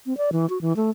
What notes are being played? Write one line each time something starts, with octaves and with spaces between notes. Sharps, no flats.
C4
D5
E3
F#4
E3
A3